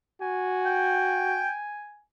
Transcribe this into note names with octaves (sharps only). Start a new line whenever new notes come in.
F#4 G#5
G5